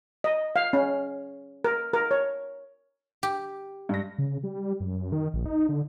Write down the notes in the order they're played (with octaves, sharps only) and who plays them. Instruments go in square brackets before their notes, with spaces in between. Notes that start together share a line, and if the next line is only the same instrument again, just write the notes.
[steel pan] D#5
F5
C#4
A#4
A#4
C#5
[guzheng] G4
[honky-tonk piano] G2 A#6
[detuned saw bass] C#3
G3
F#2
D#3
A#1
D#4
D3